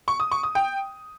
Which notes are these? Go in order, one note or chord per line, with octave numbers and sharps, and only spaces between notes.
C#6
D#6
C#6
D#6
G5